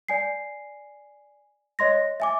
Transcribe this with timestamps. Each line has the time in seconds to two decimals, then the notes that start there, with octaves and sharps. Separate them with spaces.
0.08 D5 G#5 C7
1.79 C#5 D#5 C6 A#6
2.20 E5 G#5 D6